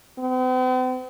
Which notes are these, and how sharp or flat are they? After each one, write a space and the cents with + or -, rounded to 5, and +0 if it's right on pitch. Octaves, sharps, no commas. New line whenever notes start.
C4 -45